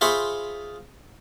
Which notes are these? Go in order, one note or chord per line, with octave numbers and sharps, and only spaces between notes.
F4 G#4 C5 E5 B5 C#6